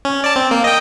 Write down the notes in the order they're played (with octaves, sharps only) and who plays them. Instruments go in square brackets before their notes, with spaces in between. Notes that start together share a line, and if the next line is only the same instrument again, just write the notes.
[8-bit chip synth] C#4
D5 A5
C4
A#3
D#5 G5